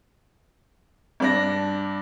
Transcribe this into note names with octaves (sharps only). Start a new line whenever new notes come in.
G2 D4 A#6